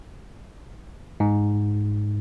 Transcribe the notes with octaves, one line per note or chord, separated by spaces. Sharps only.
G#2